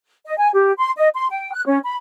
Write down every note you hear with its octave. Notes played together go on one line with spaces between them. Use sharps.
D#5
G#5
G4
C6
D#5
C6
G5
F#6
C#4
B5